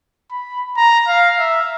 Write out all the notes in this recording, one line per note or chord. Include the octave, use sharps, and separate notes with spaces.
B5
A#5
F5
E5